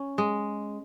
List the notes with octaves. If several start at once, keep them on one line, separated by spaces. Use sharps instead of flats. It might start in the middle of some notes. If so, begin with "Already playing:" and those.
Already playing: C#4
G#3